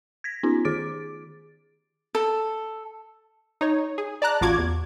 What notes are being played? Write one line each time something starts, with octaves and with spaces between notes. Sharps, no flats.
G#6 A#6 B6
B3 C#4 D#4 F4 G4
D#3 G#4 D6 A6 D7
A4
D#4 C#5
G#4
D5 A5 A#5 F#6
A1 F4 F#4 D6 G#6
E2